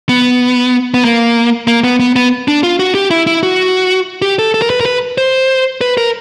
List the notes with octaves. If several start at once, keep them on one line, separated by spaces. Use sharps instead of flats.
B3
B3
A#3
A#3
B3
B3
B3
D4
F4
F#4
G4
E4
E4
F#4
G4
A4
A4
A#4
B4
A#4
B4
C5
B4
A#4